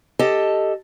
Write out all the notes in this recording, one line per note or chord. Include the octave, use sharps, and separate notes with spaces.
G4 A4 D#5 A5